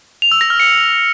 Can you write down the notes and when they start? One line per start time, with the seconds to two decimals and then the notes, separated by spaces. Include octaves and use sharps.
0.22 F7
0.31 E6
0.41 A#6
0.50 F6
0.60 C#7